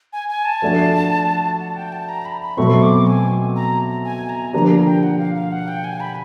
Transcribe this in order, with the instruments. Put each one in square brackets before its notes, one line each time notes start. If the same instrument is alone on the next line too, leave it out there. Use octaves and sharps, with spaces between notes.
[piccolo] G#5
G#5
A5
[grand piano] F3 A3 D4 F#4
[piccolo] F#5
G5
A5
A#5
B5
B5
[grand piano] B2 F#3 A3 C4 [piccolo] C#6
[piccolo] D6
G#5
A#5
G#5
A#5
[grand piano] D3 F3 A#3 D4 G4 [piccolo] A#5
[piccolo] A#5
G5
F#5
F5
F5
F#5
G5
G#5
B5